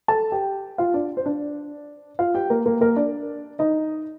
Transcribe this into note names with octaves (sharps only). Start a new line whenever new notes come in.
A4 A5
G4 G5
F4 F5
D4 D5
C5
D4 D5
F4 F5
G4 G5
A#3 A#4
A#3 A#4
A#3 A#4
D4 D5
D#4 D#5